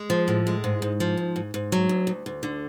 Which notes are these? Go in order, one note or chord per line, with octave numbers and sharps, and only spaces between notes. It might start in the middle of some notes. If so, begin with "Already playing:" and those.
Already playing: G#3
F3
A2
G#3
G#2
G#2
F3
G#2
G#2
G#2
F#3
D2
D2
D2
D3